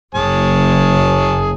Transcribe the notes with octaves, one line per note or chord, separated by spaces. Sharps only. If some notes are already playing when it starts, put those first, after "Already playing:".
F#1 G#4 C#5 A5